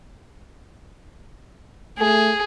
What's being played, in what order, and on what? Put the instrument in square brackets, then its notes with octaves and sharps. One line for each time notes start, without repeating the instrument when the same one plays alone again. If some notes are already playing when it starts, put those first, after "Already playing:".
[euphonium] A3 [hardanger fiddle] G#4